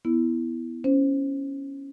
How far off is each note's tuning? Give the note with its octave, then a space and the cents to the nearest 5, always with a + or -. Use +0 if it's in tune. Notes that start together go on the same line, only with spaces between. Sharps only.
B3 +0 E4 +0
C#4 +0 C5 +0